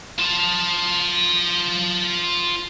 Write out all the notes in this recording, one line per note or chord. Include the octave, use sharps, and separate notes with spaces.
F4 A5